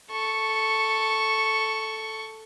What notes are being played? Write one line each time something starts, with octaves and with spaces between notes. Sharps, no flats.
A4 C#6